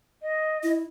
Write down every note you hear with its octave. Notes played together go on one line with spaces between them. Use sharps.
D#5
E4